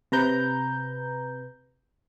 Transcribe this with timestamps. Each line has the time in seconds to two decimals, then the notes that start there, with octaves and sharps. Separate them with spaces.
0.12 C3 B4 A#5 G6